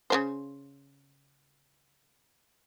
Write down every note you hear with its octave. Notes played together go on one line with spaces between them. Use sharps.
C#3 A#3 C5